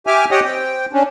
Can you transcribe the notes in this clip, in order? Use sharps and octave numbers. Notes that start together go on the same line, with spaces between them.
G4 E5 G#5 D6 F6
G4 C#5 D#5 F#5 G5 D#6
C4 G5
C#4 D4